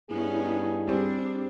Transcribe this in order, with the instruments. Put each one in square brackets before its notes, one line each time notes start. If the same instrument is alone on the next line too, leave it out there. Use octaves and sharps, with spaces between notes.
[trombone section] G2 G#4 [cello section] B3 C#4 D#4 [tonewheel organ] E4
[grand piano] G3 C4 [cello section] D4